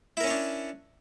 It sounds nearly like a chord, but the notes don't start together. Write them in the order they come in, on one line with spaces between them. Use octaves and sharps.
E4 A#4 C#4 C#5 D4